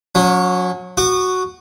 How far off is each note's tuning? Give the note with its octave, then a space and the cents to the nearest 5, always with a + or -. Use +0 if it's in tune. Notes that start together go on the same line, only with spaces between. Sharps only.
F#3 -30 C#4 +20
F#4 +0 D#6 -40